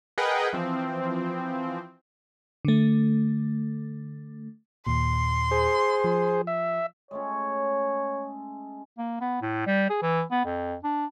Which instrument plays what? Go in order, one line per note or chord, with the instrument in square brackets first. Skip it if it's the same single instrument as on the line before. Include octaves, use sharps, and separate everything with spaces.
[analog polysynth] G#4 A#4 B4 D#5 F#5 G5
E3 F3 C4
[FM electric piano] D3 A3
[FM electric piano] D#2 A#2 [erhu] C6
[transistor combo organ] G#4 C5
[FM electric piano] F3
[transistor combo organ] E5
[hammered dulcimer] G#3 A3 C#4 [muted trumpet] C#5
[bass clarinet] A#3
B3
A2
G3
G#4
E3
B3
F2
D4